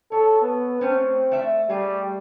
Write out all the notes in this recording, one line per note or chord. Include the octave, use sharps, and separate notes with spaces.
A4 C#5
B3
A3 C4 C#4
A3 D5 E5
G3 A3 G#4